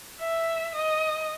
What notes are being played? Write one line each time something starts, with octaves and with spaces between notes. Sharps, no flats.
E5
D#5